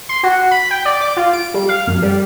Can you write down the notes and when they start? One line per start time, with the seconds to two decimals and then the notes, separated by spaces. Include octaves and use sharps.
0.09 C6
0.23 F#4
0.51 B5
0.71 G5
0.85 D5
1.01 D6
1.17 F4
1.33 D7
1.54 G3
1.69 F5
1.87 F#2
2.02 G3